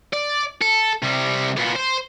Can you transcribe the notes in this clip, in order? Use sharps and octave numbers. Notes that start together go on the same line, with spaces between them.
D5
A4
C3 G3
A#2 B3
C5